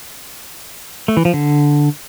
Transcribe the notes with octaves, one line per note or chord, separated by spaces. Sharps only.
A3
E3
F3
D3